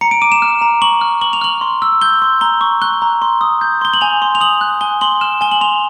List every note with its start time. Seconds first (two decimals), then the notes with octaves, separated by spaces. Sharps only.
0.01 A#5 C#7
0.11 D7
0.22 D6 D#7
0.32 E7
0.42 F6
0.62 A#5
0.82 C#6 F#7
1.01 F6
1.21 C#6 F#7
1.33 F7
1.41 F6 F#7
1.61 C6
1.82 E6
2.02 G6 G7
2.22 C6
2.41 A#5 G7
2.61 C#6
2.82 F#6 G7
3.02 A#5
3.22 C6
3.41 D#6
3.61 G6
3.81 C6 G7
3.94 F#7
4.01 G#5 F7
4.22 C6
4.35 F7
4.41 D#6 F#7
4.61 F#6
4.81 G#5 G7
5.01 C6 F#7
5.21 F6 E7
5.41 G#5 G7
5.51 F#7
5.61 C6 F7